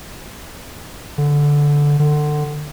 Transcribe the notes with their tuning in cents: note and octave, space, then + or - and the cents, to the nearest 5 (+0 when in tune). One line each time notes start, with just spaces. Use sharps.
D3 -10
D3 +25